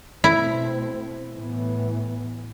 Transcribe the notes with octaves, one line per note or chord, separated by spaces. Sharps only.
B2 A3 C4 E4
A2 E3 B3